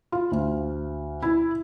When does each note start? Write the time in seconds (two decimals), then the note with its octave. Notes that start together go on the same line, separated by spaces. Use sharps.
0.12 F4
0.31 D2
1.22 E4